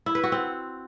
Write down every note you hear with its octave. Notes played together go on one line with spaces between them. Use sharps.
E4
B4
F#4
C4